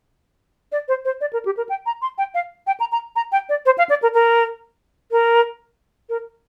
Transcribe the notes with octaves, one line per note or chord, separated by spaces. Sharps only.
D5
C5
C5
D5
A#4
G4
A#4
G5
A#5
C6
G5
F5
G5
A#5
A#5
A#5
G5
D5
C5
F5
D5
A#4
A#4
A#4
A#4